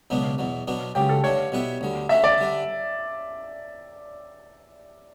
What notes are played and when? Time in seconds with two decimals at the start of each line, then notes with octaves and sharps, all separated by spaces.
0.10 C#2 B2 F#3 B3 D4
0.38 E2 B2 F#3
0.67 B2 F#3 B3 D4
0.95 C#2 C#3 F#3 G4
1.09 A4
1.24 G2 D3 A3 D4 C#5
1.52 B2 G3 B3 E4 B4
1.81 D2 D3 G3
2.09 D3 A3 C#4 F#4 E5
2.24 D5
2.38 D3 G3 D4